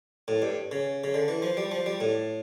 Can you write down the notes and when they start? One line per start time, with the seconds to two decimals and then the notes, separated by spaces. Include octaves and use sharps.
0.28 A2
0.42 G2
0.71 C#3
1.04 C#3
1.14 D3
1.28 E3
1.42 F3
1.57 G3
1.71 F3
1.86 G3
2.01 A2